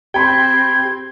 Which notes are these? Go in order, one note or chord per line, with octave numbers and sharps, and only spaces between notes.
C4 G4 G5 B5 C6 G6 G#6